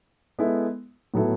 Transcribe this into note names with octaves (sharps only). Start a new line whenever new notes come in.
G#3 B3 E4 A4
A2 F#3 B3 E4 A4